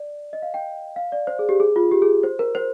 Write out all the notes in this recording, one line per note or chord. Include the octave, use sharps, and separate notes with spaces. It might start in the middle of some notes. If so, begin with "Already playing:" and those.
Already playing: D5
D#5
F5
G5
F5
D5
C5
G#4
G4
G#4
F4
G4
G#4
C5
A#4
C5